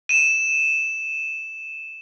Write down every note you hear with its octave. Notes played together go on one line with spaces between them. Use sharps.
D#7 E7